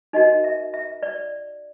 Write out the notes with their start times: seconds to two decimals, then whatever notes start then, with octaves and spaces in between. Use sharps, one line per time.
0.13 D#4 F#4 A#4 D#5
0.44 E5
0.74 E5
1.03 D5